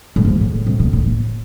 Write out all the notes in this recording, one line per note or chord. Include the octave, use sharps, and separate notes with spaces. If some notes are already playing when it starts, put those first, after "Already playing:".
A2
G#2
A2
C3
B2
A#2
A2